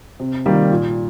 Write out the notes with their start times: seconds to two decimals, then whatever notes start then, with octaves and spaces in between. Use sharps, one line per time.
0.20 C3
0.46 D#3 G3 A#3
0.71 A#2